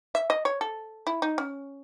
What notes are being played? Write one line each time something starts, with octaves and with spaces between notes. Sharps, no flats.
E5
D#5
C#5
A4
E4
D#4
C#4